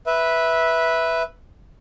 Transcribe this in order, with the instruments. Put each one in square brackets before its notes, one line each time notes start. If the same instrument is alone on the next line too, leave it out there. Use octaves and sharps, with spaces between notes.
[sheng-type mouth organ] B4 E5